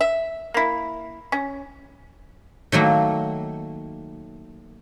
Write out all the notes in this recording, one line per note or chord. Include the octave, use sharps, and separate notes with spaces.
E5
A#3 E4
C#4
D#3 F#3 A3 A#3